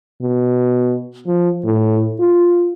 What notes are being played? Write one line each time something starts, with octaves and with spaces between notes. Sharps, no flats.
B2
F3
A2
F4